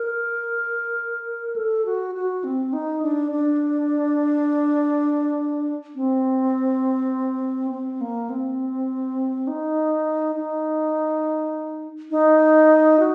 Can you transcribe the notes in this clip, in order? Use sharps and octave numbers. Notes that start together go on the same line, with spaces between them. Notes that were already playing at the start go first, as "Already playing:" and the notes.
Already playing: A#4
A4
F#4
F#4
C4
D#4
D4
D4
C4
C4
A#3
C4
D#4
D#4
D#4
F#4